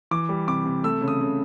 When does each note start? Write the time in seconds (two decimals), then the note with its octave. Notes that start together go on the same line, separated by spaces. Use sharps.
0.11 E3 D6
0.29 G3
0.48 C3 D6
0.66 C3
0.84 A3 E6
1.02 C#3
1.08 D#6
1.21 C#3